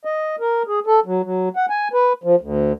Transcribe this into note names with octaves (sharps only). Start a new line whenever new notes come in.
D#5
A#4
G#4
A4
F#3
F#3
F#5
G#5
B4
F3
D2